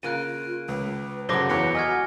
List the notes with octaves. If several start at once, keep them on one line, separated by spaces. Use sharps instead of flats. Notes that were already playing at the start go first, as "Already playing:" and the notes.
C#3 A#3 F4 F#6 D7 D#7
C#2 B4
F#2 C#3 F#3 A4 C5 D6 A#6 G7
E2 B4 C#5 F#5 C#7
F#4 D#5 G#5 F6 G#6